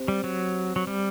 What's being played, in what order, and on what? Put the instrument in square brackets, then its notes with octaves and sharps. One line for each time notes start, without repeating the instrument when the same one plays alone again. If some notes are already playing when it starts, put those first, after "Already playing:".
Already playing: [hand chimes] C4 G4 C5
[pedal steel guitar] G3
F#3
F#3
G3